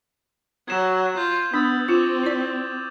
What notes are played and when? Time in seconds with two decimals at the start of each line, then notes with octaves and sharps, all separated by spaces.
0.68 F#3 G#6 E7 F#7
1.17 F4 G6
1.54 B3 D4 D#6 E6 A6
1.88 C4 F4 C#6 D6 E7
2.24 E4 D5